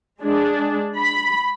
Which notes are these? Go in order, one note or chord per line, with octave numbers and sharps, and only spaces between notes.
G#3 D4 G#4
B5